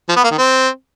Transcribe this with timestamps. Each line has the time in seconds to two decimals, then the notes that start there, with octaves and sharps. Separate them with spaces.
0.09 F3
0.16 B3
0.23 A#3
0.31 D#3
0.38 C4